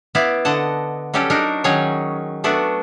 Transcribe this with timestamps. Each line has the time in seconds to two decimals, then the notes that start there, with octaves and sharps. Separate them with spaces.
0.15 B3 E4 D5 F5
0.45 D3 D#5 F#5 A5
1.14 F#3 G3 C#4 G4 A4
1.30 D4 D#4 F#4 A#4
1.64 D#3 F#3 C#4 D#4 G#4 C#5
2.44 A3 B3 D4 F#4 A4